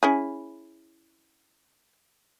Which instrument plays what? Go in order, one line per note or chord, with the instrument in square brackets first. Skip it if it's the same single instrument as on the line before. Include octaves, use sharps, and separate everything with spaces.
[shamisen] C#4 E4 G#4